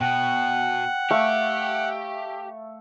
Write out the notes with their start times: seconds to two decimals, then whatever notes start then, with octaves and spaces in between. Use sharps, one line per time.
0.01 B2 F#5 G5
1.11 A3 G4 F5 C#6